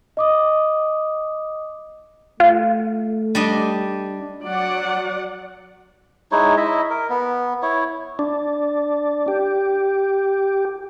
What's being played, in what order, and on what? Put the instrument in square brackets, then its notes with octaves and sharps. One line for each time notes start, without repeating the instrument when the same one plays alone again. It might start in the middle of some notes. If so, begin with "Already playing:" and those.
[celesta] D#5 D6 D#6
[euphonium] A3 [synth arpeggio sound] F4
[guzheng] G3 D4 D#5
[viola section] F#3 D5 F#5
[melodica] G#3 D#4 E4 C#5
E4 D#5 E5
A#4
B3
E4 C#5
[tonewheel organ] D4
G4